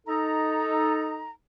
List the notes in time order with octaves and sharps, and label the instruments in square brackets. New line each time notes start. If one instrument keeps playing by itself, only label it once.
[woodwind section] D#4 A4 A#5